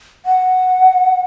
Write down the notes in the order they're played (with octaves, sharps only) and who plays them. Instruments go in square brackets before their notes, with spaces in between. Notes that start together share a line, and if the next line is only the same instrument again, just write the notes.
[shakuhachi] F#5